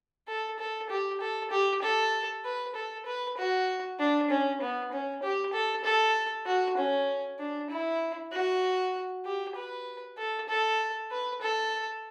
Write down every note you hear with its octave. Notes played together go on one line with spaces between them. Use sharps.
A4
A4
G4
A4
G4
A4
B4
A4
B4
F#4
D4
C#4
B3
C#4
G4
A4
A4
F#4
C#4
D4
E4
F#4
G4
B4
A4
A4
B4
A4